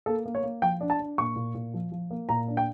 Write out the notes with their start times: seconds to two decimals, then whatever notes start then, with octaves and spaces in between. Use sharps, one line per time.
0.06 A#3 A4
0.26 A#3
0.35 C#5
0.43 A#3
0.62 F3 G5
0.81 D4
0.90 A5
1.00 D4
1.18 A#2 C#6
1.36 A#2
1.55 A#2
1.74 F3
1.92 F3
2.11 A#3
2.29 A#2 A#5
2.48 D4
2.57 G5